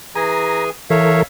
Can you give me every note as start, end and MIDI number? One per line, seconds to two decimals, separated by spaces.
0.15 0.70 52
0.15 0.70 68
0.15 0.70 80
0.15 0.64 82
0.90 1.23 52
0.90 1.23 69
0.90 1.23 70
0.90 1.21 73
0.90 1.21 76
0.90 1.21 77